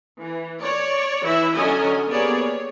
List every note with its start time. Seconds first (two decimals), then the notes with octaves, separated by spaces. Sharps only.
0.19 E3
0.61 C#5 D5
1.23 E3 E4 E5
1.54 D3 F#3 C#4 D#5 G#5
2.09 A#3 B3 G4 G#4 C#5 D5
2.37 C#5